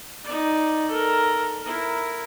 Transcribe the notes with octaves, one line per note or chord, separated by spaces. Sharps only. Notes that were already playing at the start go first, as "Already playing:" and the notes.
D#4 D5
A4 A#4
E4 A#4